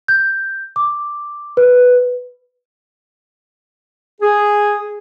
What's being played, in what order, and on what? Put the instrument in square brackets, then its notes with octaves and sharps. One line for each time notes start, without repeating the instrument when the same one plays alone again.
[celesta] G6
D6
B4
[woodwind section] G#4